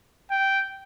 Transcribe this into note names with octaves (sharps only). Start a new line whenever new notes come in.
G5